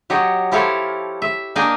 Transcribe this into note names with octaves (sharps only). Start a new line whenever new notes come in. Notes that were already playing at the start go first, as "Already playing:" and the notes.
F#3 G4 C#5 D#5
F3 E4 G4 A4 C#5 F5
E5
A#3 D4 D#5 F5 G5 G#5